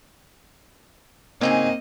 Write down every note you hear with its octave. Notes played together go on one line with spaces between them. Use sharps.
C#3 A#3 C4 D#4 G#4 D#5